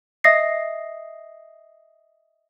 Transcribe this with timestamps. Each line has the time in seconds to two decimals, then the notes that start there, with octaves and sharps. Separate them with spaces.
0.24 D#5 E5 D#6 A#6 C7